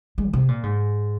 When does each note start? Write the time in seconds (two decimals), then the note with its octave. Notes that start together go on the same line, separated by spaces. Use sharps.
0.18 G#3
0.28 D3
0.33 C3
0.48 A#2
0.63 G#2